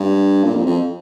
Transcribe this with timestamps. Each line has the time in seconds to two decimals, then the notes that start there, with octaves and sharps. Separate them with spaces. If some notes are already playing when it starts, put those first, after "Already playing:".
Already playing: G2
0.44 A#2
0.55 F2
0.66 F2